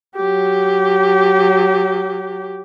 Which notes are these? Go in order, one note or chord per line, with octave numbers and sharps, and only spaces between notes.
F#3 G4